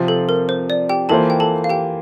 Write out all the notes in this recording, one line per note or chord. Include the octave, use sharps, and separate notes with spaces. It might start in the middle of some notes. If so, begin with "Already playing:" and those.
Already playing: C3 F3 C4 F4
A4
A#4
C5
D5
G4 G5
E3 A#3 F4 A4 C5 A5
G5
A4 A5
F5
G4 G5